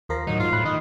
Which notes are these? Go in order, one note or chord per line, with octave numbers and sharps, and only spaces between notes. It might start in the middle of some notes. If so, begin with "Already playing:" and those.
D#2 F3 A#4 A#6
A2 D#3 F#3 D#4
G#2 F4
A2 B5 F#6
D#3 D#5